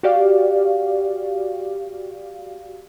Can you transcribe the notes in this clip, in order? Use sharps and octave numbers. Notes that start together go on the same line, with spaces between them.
F#4 G4 D5 F5